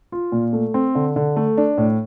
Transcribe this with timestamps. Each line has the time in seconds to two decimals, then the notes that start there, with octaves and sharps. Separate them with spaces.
0.12 F4
0.32 A#2
0.53 A3
0.74 C4
0.95 D3
1.16 D3
1.36 A3
1.58 D4
1.78 A2